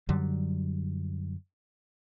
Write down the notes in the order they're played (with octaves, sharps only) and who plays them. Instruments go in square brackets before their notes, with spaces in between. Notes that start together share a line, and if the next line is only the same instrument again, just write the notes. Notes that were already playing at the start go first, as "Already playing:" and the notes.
[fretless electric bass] F#2 D3 F#3 G3